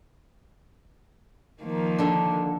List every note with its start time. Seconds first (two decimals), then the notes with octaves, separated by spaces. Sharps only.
1.63 D#3 F3 A#3
1.98 D3 D4